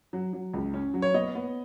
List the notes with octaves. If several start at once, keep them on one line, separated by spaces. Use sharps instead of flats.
F#3
F#3
C#2
C#4
F#3
C#5
B3 D#5
B3